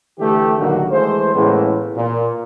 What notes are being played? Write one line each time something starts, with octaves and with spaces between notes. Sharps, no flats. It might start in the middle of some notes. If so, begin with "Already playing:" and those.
D3 E3 A3 G4
A#1 D3 D#3 F#3 A#3 F#4
E3 G#3 A3 C5
A2 C#3 E3 G#3 A#3 B3
A#2